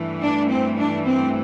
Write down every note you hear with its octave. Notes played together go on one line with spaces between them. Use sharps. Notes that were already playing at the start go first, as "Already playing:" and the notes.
Already playing: G2 E3 A3
D4
C4
D4
C4